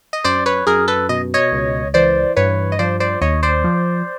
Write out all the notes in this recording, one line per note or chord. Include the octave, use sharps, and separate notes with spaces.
D#5
F#2 C5 D5
B4 C#5
F#2 G#4 A#4
A4 B4
B2 D#5
C#5 D#5
C#2
E3 C5 D5
G2 B4 C#5
D#5
F3 C5 D5
C5 D5
D#2 C#5 D#5
C5 D5
F3